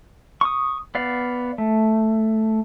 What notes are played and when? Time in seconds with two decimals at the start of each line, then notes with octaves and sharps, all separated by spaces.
0.41 C#6 D#6
0.95 B3 D5 F5
1.58 A3